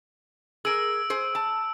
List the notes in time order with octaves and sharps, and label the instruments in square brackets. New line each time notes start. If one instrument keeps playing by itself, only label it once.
[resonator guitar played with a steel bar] G#4 A#4 [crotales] E6 D7
[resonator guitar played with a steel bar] G#4 C5
A5